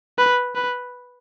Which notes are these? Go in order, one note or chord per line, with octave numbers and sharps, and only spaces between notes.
B4
B4